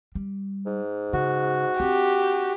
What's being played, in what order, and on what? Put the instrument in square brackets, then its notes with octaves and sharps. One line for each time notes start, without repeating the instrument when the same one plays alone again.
[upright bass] G3
[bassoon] G#2
[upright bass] C#3 [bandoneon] F#4
[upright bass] C4 D4 [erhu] G4